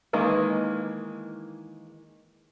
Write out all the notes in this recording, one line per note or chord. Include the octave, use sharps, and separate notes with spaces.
D#3 E3 G#3 A#3